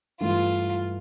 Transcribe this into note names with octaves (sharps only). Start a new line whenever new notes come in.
G2 E3 A3 F4